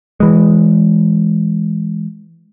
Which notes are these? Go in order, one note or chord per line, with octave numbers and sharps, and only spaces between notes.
E3 G#3